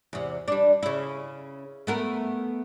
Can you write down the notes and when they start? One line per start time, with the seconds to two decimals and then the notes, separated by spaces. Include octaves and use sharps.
0.13 E2 C3
0.48 G3 D4
0.83 C#3 E4
1.87 A3 B3 A#4